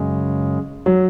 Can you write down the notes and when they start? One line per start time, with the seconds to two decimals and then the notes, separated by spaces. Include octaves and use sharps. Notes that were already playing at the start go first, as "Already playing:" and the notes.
Already playing: F#2 C#3 G#3
0.86 F#3